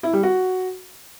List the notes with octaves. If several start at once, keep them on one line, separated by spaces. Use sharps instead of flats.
E4
G3
F#4